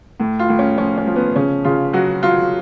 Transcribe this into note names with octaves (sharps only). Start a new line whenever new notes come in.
A2
F4
A2
C#4
F3 C#4
C#4
F3
B3
C#3 C#4
C#3 F4
F#3 F#4
F#3 F4